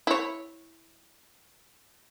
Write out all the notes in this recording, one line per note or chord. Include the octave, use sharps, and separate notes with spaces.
E4 C#5